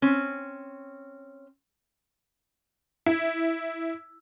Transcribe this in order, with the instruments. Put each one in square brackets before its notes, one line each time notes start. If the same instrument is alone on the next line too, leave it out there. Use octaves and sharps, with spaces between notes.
[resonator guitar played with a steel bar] C4 C#4
[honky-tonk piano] E4